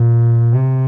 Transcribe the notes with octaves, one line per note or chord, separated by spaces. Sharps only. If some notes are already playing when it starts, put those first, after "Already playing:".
Already playing: A#2
C3